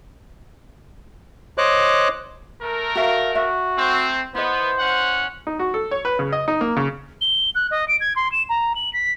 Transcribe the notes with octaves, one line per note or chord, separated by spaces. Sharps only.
C5 C#5 D#5 D6 F#6
A3 A#4
F#4 E5 F5
F#4 E5
A3 C4
B3 E4 C5 D#5
C#4 F#5
D#4
F#4
A4
C#5
B4
C#3
D#5
D#4
A#3
C#3
G7
F#6
D#5
D7
G#6
C6
E7
A#5
F#7
B6